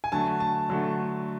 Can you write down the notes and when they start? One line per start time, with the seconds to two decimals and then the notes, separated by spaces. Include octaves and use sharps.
0.04 G#5
0.12 D3 F#3 A3 A5
0.40 A5
0.69 D3 F#3 A3